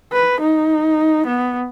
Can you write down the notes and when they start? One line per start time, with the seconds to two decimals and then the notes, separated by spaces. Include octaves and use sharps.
0.13 B4
0.41 D#4
1.26 B3